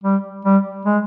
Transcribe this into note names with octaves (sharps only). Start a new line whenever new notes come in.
G3
G3
G#3